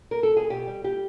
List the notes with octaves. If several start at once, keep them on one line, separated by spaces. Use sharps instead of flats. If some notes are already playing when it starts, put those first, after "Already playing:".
A#4
A4
G#4
B2 G4
G3
G3 G4